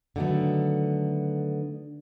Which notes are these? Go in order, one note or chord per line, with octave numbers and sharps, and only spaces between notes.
D3 D#3 F#3 A3 B3